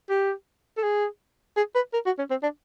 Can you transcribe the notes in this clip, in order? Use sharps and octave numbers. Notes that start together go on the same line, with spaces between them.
G4
A4
G#4
G#4
B4
A#4
F#4
C#4
C4
D4